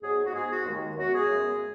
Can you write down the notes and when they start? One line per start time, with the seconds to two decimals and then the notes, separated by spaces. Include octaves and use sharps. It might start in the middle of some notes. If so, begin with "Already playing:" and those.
0.02 G#2 F#3 B3 G#4
0.25 F#4
0.33 G#2 G#3 B3 G#4
0.50 F#4
0.66 D#2 D#3 G#3
0.96 F#2 F#3 B3 F#4
1.13 G#4
1.28 F#2 C#3 G#3 B3